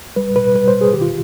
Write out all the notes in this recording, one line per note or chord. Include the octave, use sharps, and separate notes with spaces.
G3 B4
B2 B4
G3 B4
C5
B2
G#4
D#3 G4
F4